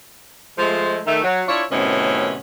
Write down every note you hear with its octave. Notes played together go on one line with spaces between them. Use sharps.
F3 G#3 A3
D#3 A3
F#3
D4 E4 F4 C#5
F#2 A2 C3 D#3 B3 C#4